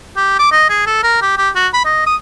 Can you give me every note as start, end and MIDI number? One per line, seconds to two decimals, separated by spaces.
0.17 0.35 67
0.39 0.51 86
0.52 0.67 75
0.69 0.86 68
0.86 0.98 69
1.03 1.19 70
1.22 1.34 67
1.38 1.50 67
1.55 1.67 66
1.73 1.81 83
1.85 2.06 75
2.06 2.16 87